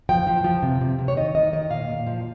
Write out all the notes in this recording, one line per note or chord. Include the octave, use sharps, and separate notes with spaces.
F3 G5
F3
F3
C3
C3
C3
C#5
D#3 D#5
D#3 D#5
D#3 D#5
A#2 F5
A#2
F3